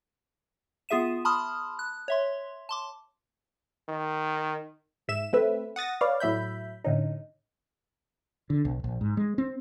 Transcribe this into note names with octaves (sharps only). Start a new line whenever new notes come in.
B3 F4 G#4 E5 D#7 E7
A5 B5 C6 D#6 F6
F#6
C#5 E5 C6
A5 C6 D6
D#3
G#2 E5 E7
A3 C4 B4 E5
F#5 D#6 A6 A#6
B4 C#5 D5 F5
A2 F#3 E5 B5 G6
A2 D3 C#4 D#4
D3
B1
A#1
G#2
G#3
C4